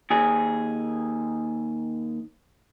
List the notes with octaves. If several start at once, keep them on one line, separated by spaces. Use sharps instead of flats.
D#2 G#4